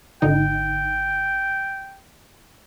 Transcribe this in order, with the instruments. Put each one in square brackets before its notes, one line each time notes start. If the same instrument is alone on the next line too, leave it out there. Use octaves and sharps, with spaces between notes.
[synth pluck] G#1 D3 D#4 [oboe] G5